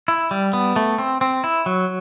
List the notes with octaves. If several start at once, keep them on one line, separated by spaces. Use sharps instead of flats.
E4
G3
B3
A3
C4
C4
E4
F#3